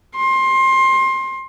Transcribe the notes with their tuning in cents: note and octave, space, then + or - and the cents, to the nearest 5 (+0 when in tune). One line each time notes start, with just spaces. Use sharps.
C6 +25